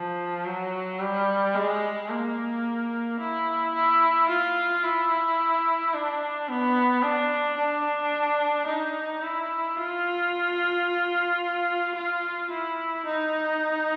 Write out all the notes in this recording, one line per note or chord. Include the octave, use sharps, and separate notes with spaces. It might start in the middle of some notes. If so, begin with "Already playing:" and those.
Already playing: F3
F#3
G3
G#3
A#3
E4
E4
F4
E4
D4
B3
D4
D4
D#4
E4
F4
F4
E4
D#4